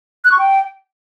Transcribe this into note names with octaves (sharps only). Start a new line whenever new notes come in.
F#6
C#6
G5